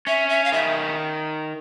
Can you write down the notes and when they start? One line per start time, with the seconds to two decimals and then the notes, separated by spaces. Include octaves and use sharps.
0.07 C#4 E5
0.29 E5
0.44 F5
0.52 D#3 E5